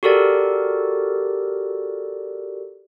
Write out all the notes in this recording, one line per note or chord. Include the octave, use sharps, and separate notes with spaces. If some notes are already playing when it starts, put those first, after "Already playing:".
F#4 G4 A4 A#4 D5